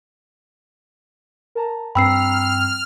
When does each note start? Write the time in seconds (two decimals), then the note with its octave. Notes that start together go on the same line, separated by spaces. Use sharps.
1.55 A#4 A5 A#5
1.95 G2 C4 G5 A#5 B5 E6 F6 C7